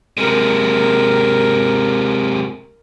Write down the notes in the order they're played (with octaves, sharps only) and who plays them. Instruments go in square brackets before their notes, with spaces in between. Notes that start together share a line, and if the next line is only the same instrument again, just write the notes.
[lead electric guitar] C3 G#3 [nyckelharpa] A#4